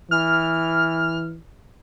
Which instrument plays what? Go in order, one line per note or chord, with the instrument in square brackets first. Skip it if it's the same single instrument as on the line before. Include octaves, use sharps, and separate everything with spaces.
[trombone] E3 [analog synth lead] F6